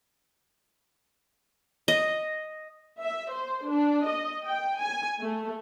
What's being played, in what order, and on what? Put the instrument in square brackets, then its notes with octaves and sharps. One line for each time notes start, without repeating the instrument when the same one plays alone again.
[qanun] D#5
[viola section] E5
C5
D4
D#5
G5
G#5
A3